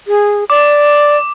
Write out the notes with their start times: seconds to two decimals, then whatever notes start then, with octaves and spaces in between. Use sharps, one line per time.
0.08 G#4
0.50 D5 D6